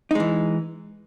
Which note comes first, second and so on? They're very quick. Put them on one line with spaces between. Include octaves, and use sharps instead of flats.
D#4 G#3 E3